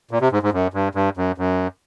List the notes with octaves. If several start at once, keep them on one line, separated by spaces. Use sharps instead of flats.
A#2
C3
G#2
G#2
F#2
G2
G2
F#2
F#2